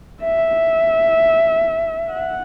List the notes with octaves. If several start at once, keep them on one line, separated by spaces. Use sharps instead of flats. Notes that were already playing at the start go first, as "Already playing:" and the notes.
E5
F#5